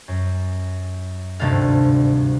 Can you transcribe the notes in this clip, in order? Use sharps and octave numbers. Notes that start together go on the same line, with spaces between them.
F#2
G#1 D2 G2 C3 A4 F5